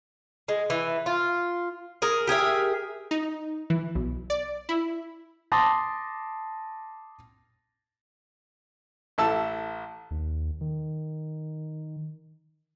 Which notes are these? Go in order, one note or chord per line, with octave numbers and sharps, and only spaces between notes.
G#3
E3
F4
G#4 A#4
G4 G#4 A#4 E5
D#4
E3
B1
D5
E4
A5 C6 D6 D#6 A6 A#6
A1 E4 A4 A5 E6
D#2
D#3